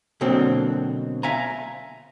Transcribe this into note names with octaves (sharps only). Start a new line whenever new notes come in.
B2 D3 F#3 A#3 C4
E5 F5 G#5 A#5